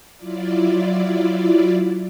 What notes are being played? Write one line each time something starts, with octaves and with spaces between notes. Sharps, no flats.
F#3 E4 F4 D5